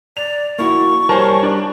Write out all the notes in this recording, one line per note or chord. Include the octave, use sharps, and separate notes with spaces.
D5 F7
A#3 E4 F#4 C#6
G3 A#4 C5 C#5 G#5 A5
D4